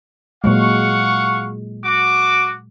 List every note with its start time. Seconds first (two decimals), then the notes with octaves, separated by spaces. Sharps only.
0.44 A#2 F#3 G#3 F5 F#5 C#6
1.85 F#4 D6